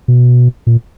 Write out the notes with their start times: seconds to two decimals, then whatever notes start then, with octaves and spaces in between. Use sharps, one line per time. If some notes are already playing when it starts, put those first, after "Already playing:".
0.08 B2
0.67 A#2